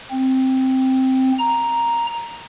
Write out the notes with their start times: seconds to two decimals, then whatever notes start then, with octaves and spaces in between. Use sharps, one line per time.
0.10 C4
1.38 A#5